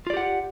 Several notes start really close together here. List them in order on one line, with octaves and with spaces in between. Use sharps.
F4 D5 G4 F#5